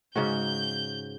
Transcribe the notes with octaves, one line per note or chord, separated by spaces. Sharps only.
G#2 C#3 F#4 G6